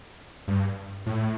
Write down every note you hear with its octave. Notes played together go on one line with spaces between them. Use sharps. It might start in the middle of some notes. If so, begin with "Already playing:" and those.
G2
A2